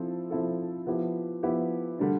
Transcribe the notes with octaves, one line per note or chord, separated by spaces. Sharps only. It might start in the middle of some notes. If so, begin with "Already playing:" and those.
Already playing: F3 C4 E4 A4
F3 C4 E4 A4
F3 B3 E4 G4
F3 B3 E4 G4
D3 G3 D4